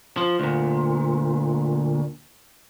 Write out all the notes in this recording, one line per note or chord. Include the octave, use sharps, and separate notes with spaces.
F3
D2 A#2